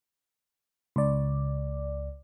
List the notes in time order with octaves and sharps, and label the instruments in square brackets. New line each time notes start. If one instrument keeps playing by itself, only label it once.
[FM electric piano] C#2 D5